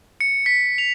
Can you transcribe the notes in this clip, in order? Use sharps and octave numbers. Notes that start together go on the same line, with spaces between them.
C#7
B6
F7